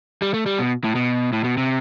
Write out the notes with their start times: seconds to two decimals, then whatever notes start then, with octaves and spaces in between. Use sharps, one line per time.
0.22 G3
0.34 A3
0.46 G3
0.59 B2
0.84 A2
0.95 B2
1.33 A2
1.44 B2
1.58 C3